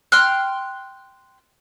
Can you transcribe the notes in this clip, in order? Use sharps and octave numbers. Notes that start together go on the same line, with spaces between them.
G5 C6 F6 F#6